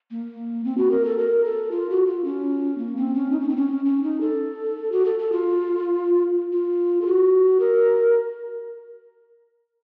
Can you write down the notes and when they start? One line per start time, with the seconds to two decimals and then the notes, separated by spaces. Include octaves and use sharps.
0.11 A#3
0.65 C4
0.78 F#4
0.91 A#4
1.05 A4
1.18 A#4
1.45 A4
1.71 F4
1.90 F#4
2.07 F4
2.25 C#4
2.78 A#3
2.97 C4
3.15 C#4
3.31 D#4
3.41 C#4
3.49 C4
3.57 C#4
3.85 C#4
4.03 D#4
4.21 A4
4.92 F#4
5.05 A4
5.19 A4
5.32 F4
6.53 F4
7.02 A4
7.06 F#4
7.60 A#4